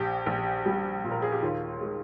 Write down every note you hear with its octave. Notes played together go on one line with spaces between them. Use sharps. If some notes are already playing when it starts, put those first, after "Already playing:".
Already playing: A#1 G4
A#1
G3
A#2
A#4
G#4
G4
D#2 F4
G#3